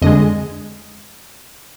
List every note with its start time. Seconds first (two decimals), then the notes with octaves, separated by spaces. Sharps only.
0.02 F2 D3 G#3 D#5